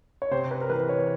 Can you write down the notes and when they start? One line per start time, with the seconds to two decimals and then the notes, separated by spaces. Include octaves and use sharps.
0.22 C#5
0.31 C3 C5
0.51 B4
0.61 A#4
0.70 E3 B4
0.89 C#5